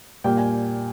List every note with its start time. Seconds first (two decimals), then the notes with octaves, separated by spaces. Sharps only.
0.24 A#2 G3 A#3 G5
0.37 G#5